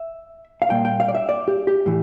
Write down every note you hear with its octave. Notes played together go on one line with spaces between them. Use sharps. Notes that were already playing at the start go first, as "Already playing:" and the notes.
Already playing: E5
F5
A#2 G3 A#3 G5
G5
F5
D5
E5
D5
G4
G4
A2 E3